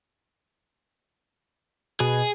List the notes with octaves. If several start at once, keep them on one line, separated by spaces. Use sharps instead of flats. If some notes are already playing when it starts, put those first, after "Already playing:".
B2 G#4